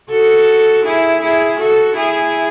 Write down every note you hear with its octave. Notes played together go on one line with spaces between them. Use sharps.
F#4 A4
E4 G#4
E4 G#4
F#4 A4
E4 G#4